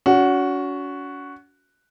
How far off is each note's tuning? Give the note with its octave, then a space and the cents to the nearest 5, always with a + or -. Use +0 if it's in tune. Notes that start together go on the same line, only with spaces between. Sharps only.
C#4 +40 F#4 +0